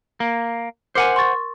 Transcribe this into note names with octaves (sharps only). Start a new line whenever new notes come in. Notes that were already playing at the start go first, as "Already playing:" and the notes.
A#3
A#4 C5 F#5 G#5 D6 C7
C6 C#6 A6